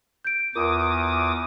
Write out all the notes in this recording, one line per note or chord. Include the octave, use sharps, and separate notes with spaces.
G6 D7
E2 F4 A#4 D6 D#6